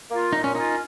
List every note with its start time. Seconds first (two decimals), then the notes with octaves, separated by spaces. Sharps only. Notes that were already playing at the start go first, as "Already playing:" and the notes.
0.10 A#3 F4
0.33 A#2 D#4
0.44 C#4
0.55 A#3 C#4 D#4 F4